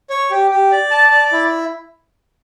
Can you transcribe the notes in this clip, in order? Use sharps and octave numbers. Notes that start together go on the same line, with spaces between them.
C#5
G4
G4
D5
A5
D5
E4